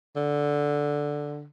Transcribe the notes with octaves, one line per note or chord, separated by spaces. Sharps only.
D3